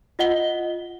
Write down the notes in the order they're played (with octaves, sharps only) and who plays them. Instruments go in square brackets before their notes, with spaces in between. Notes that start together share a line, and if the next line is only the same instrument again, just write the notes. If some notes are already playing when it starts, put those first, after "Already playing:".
[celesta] F4 D#5 F#5 G7